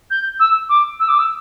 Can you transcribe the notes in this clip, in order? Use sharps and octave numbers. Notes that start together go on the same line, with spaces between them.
G6
E6
D6
E6
D6
E6